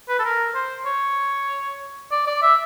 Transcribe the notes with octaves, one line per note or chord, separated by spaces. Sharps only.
B4
A4
A#4
C5
C#5
D5
D5
E5